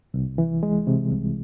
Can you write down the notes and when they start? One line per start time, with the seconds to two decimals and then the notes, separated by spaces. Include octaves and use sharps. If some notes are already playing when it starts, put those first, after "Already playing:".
0.14 C2
0.38 E3
0.63 G#3
0.87 C3
1.12 C2